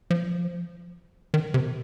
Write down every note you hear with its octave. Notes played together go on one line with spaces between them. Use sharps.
F3
D#3
C3